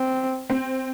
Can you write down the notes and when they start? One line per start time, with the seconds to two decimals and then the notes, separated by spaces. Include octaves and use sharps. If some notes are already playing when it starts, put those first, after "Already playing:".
Already playing: C4
0.50 C4